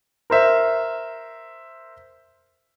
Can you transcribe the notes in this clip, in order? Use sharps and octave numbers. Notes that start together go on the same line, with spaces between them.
A#4 C5 E5